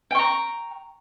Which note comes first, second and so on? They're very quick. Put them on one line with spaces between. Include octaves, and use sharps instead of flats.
G5 C#6 A#5